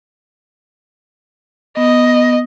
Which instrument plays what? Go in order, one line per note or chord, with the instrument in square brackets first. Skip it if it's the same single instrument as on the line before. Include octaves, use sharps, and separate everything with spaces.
[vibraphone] B3 [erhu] D#5